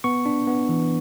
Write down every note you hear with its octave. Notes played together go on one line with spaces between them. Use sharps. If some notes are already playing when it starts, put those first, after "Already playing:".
B3 C#6
D4
B3
E3